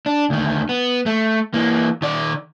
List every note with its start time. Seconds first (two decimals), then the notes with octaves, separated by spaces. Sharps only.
0.06 D4
0.30 D2 D#3
0.69 B3
1.06 A3
1.54 E3 A#3
2.02 D#3 D5